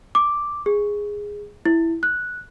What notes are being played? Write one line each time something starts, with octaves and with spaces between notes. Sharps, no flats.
D6
G#4
E4
F#6